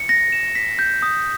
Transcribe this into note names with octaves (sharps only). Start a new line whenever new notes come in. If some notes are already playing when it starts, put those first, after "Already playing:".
Already playing: C#7
A#6
E7
B6
G6
D#6